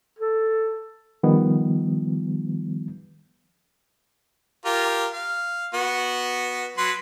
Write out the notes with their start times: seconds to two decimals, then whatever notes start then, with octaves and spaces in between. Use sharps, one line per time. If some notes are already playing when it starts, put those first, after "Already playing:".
0.19 A4
1.23 D#3 F3 G3 B3
4.65 F4 G4 A#4
5.12 F5
5.74 B3 F#4
6.78 F#3 B4 C6